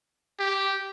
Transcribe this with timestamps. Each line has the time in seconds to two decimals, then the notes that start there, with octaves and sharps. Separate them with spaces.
0.39 G4